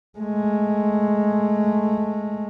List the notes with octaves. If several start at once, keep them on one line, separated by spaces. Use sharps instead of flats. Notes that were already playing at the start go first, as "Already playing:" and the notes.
G#3 A3